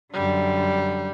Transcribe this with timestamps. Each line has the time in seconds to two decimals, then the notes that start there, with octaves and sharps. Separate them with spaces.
0.14 F#2 D3 G3